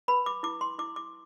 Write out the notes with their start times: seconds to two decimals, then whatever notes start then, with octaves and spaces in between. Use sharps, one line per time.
0.08 B4 B5
0.26 D6
0.43 E4 D6
0.61 C6
0.79 E4 D6
0.96 D6